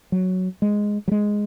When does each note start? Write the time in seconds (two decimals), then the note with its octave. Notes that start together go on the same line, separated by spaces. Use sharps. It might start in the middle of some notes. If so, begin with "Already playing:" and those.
0.12 F#3
0.62 G#3
1.08 F#3
1.11 G#3